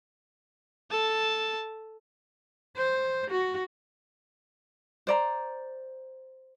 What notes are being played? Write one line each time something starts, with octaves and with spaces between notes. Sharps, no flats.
A4 A5
C5
F#4
C5 D5 A#5